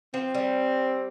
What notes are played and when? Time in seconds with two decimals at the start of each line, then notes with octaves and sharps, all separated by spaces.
0.14 F3 C4
0.35 G3